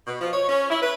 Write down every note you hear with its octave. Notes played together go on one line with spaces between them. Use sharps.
B2
F3
C#5
C#4
E4
B4